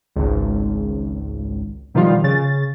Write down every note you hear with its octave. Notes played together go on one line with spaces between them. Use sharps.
G#1 C#2
B2 D#3 F3 G3 F4
C#3 A6